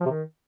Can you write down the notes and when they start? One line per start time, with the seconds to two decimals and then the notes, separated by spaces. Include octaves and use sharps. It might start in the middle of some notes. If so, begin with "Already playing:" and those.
0.01 F3
0.06 C3
0.11 D#3